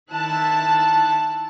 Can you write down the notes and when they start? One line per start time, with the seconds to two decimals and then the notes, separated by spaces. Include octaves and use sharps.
0.10 D#3 E4 A5 F#6